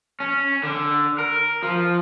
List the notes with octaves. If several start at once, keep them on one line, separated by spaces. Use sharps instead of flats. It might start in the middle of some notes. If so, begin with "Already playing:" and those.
C#4
D3
A#4
F3